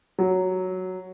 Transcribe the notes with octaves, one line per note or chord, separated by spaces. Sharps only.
F#3